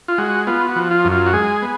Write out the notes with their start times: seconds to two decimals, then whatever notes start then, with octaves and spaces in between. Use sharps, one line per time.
0.08 F4
0.18 G#3 F#4
0.47 B3 F4
0.69 F#4
0.76 F3
0.91 F4
1.05 F#2
1.12 F4
1.27 F#4
1.33 G#3 G#4
1.62 B3